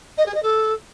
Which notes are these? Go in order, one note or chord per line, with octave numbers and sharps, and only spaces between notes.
D#5
G#4
D#5
A4